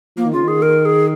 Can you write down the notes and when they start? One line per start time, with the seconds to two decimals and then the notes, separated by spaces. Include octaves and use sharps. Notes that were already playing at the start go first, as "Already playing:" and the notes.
0.17 F3 A#3
0.25 D#3
0.33 C#3 F4
0.43 D#3 G#4
0.62 A#4
0.85 G#4